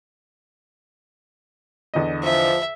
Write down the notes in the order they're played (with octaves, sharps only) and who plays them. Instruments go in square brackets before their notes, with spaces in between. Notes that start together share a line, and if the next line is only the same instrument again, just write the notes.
[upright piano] E2 D3 D#5
[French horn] F3 [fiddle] E5